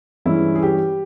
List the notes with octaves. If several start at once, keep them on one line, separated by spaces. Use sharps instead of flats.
G2 E3 G#3 C#4 E4
G#4
G4